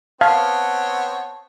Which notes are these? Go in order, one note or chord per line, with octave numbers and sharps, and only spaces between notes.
B3 C4 C#5 F5 A5